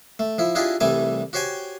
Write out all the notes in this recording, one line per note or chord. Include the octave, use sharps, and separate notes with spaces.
A3
F3 E4
D4 E4 F4 G4 G#4 D#5
C2 E3 G3 A3 G#5 D6
F#4 G4 C5 C#5 G5 G#5